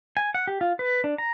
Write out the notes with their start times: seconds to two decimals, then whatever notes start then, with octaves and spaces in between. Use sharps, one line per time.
0.17 G#5
0.34 F#5
0.47 G4
0.61 F4
0.79 B4
1.04 D4
1.18 A#5